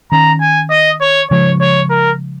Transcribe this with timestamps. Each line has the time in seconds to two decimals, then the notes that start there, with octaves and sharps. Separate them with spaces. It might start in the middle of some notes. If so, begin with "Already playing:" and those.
0.12 D#3 C#4 A#5
0.41 G#5
0.70 D#5
1.01 C#5
1.30 C#3 F3 G#3 C#5
1.61 C#5
1.90 A#4